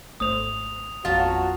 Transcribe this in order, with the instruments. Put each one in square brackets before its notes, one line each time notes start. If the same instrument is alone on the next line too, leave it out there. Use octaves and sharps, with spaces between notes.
[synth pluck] G#1 A3 C5 [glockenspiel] D#6 F7
[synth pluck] A1 F2 B6 [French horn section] F#3 B3 F#4 [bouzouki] F4 A5